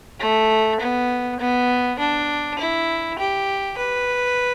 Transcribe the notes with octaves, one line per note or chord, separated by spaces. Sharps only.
A3
B3
B3
D4
E4
G4
B4